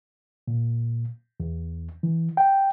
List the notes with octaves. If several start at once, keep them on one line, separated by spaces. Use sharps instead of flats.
A#2
E2
E3
G5